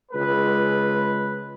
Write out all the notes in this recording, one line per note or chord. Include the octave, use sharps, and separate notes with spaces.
C#2 G#3 B4